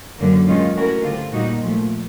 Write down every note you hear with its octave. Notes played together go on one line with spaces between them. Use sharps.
F#2 D3 F#3 A#3
G#2 D#3 G#3 C#4 F4
E3 A3 C#4 F#4 A#4
G2 D3 G3 C4 F4
A#2 G3 A#3 D#4 F#4
A#2 F3 A3